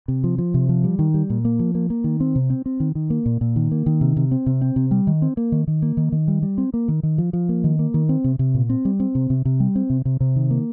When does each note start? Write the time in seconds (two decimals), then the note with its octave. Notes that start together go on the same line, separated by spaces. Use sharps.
0.08 C3
0.24 F3
0.38 F3
0.54 C3
0.69 F3
0.84 G3
0.99 D#3
1.14 G3
1.30 A#2
1.45 A#3
1.59 F3
1.75 A#3
1.90 A#3
2.04 D#3
2.20 C4
2.36 C3
2.50 C4
2.66 C4
2.80 D#3
2.95 D#3
3.10 A#3
3.26 A#2
3.41 A#2
3.56 D#3
3.71 A#3
3.86 D#3
4.01 C3
4.17 C3
4.31 C4
4.46 C3
4.62 C4
4.76 C3
4.91 G3
5.07 D#3
5.22 C4
5.37 A#3
5.52 D#3
5.67 D#3
5.82 A#3
5.97 D#3
6.12 D#3
6.28 G3
6.43 G3
6.58 C4
6.74 A#3
6.88 D#3
7.03 D#3
7.18 F3
7.33 F3
7.49 A#3
7.64 D#3
7.79 A#3
7.94 D#3
8.09 C4
8.24 C3
8.39 C3
8.54 A#2
8.69 C4
8.85 G3
9.00 C4
9.15 C3
9.30 C3
9.45 C3
9.60 G3
9.75 C4
9.90 C3
10.05 C3
10.20 C3
10.36 D#3
10.50 A#3